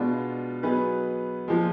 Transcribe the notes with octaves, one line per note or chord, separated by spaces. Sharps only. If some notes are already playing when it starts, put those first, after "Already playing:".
Already playing: B2 G#3 B3 D4 F4
F#3 B3 D#4 G#4 B4
A#2 F3 G#3